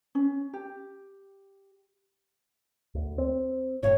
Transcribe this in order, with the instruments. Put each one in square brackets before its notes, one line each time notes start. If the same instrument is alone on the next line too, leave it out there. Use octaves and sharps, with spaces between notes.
[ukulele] C#4
G4
[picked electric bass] D2
C4
[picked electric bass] G1 A2 [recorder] C#5